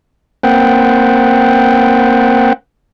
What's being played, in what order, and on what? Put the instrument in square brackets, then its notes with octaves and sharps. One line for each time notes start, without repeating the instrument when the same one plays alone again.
[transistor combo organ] A#3 C4 F#5 G5